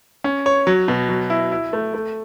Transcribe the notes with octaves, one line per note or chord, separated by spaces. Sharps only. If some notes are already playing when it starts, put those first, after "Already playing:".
C#4
C#5
F#3
B2
F#3
E4
E4
A3
A3